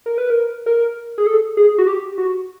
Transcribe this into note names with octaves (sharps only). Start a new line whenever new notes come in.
A#4
B4
A#4
A#4
G#4
A4
G#4
F#4
G4
F#4